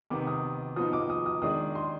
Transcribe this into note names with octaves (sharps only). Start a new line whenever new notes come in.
C3 D#3 B3 D6
D#6
F3 B3 D#4 D#6
D6
D#6
D#6
D#3 G#3 D4 D#6
C6